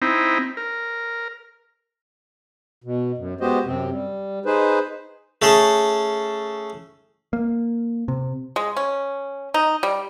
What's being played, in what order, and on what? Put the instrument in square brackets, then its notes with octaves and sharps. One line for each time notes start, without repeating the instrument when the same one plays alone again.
[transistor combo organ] C4 D#4 E4
A#4
[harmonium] B2
F#2
G#3 B3 F#4 G4 C5 D#5
F#2 C3 C4
G3
D#4 G#4 B4 C5
[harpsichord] A3 C#4 G#4 A4
[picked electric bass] A#3
C3
[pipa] G#3
C#4
D#4
G3